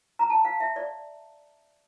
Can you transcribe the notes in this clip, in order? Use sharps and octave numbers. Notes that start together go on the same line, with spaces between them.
A#5
A5
F5
E5
D5